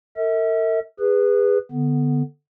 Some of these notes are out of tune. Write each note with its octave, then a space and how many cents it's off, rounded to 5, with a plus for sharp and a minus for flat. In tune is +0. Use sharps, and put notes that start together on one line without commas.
A#4 -45 E5 -40
G#4 -30 B4 +0
D3 +0 B3 +0